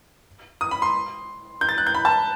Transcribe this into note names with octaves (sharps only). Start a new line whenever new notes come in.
D#6
B5
C6
G6
A6
F#6
G6
B5
A5